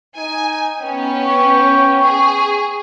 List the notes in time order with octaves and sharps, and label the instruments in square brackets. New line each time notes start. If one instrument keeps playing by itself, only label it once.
[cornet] D#4 [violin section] G#5
[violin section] B3 C#4 [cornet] G5
[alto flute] C#6
[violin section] G#4